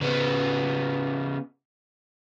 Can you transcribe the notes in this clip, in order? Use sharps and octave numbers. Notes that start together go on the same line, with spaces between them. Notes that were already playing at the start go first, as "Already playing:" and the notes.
C#3 B3